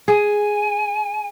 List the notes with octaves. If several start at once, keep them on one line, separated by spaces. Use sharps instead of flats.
G#4 G#5